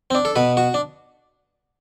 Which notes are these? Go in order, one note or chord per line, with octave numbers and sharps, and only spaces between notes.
C4
D4
A4
B2 B4
F#4
D4